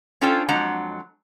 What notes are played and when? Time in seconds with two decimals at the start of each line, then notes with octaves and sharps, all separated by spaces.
0.21 C#4 D4 F4 A4 C5 G5
0.49 F2 F#3 G#3 D4 F#5 A#5